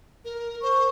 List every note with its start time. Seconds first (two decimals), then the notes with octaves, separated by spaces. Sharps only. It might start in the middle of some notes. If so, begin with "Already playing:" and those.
0.25 A#4
0.62 C5 C#6